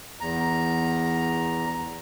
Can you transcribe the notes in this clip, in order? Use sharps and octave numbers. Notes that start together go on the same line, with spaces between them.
E2 A#5